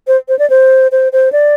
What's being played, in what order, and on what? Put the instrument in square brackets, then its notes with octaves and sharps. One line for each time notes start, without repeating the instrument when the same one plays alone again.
[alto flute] C5
C5
D5
C5
C5
C5
D5